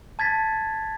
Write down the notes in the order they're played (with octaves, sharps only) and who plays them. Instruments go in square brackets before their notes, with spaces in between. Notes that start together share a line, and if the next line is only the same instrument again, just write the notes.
[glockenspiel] A5 G#6 A6 B6